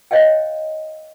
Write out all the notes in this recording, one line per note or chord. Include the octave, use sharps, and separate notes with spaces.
C5 C#5 D#5 F5 G5